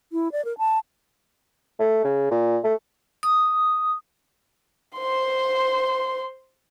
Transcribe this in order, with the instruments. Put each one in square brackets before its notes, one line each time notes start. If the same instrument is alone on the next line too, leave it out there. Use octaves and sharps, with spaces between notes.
[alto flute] E4
D5
A#4
A5
[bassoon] A3
C#3
A#2
A3
[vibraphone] D#6
[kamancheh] C5 C6